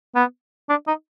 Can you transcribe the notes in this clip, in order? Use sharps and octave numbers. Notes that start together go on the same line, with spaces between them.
B3
D4
D#4